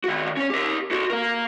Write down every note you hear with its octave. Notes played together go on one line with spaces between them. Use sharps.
D#3 F#4
C#4 C#5
G4 A#4
F#4 A4
A#3 A#4